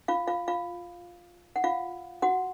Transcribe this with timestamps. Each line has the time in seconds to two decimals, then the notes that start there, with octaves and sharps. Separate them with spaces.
0.08 F4 F5
0.27 F4 F5
0.48 F4 F5
1.56 F#5
1.64 F4 F5
2.22 F#4 F#5